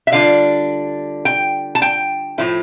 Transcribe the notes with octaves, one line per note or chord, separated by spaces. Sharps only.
E5
D3 G3 D4 F4 F5
G5
A5
G5
A2 F3 A3 E4